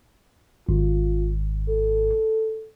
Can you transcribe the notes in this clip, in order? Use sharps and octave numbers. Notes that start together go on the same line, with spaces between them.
G#1 F4
A4